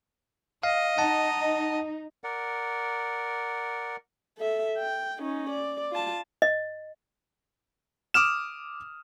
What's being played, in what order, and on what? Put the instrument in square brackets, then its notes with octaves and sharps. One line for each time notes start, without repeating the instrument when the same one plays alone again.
[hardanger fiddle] D#5 [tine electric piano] F5
[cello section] D#4 [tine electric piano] F#5 A5
[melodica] A#4 D5 F#5
[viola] A4 E5
G5
C#4 D#4
D5
F4 A5
[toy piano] D#5
[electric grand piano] D6 D#6 F6 E7